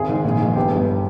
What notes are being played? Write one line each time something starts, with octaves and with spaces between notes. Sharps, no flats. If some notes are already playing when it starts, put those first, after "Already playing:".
Already playing: G#1 G#4
G#2 D#3
A#1
G#2 D#3
G1 G4
G2 E3